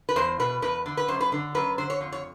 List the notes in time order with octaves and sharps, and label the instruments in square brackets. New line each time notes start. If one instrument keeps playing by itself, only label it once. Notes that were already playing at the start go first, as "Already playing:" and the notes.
[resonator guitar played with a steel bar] B4
E2 C5
B2 B4
E2 B4
D3
B4
F#2 C5
B4
D3
F#2 B4
D3 C5
C#5
F2
C#5